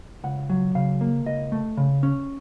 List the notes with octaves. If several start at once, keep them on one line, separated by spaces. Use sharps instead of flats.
C#2 F#5
F#3
C#3 F5
A#3
C#2 D#5
A3
C#3
C#4